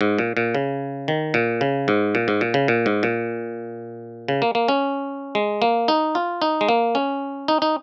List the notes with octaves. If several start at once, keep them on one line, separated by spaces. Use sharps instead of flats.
G#2
A#2
A#2
C#3
D#3
A#2
C#3
G#2
A#2
G#2
A#2
C#3
A#2
G#2
A#2
C#3
A#3
A#3
C#4
G#3
A#3
D#4
F4
D#4
G#3
A#3
C#4
D#4
D#4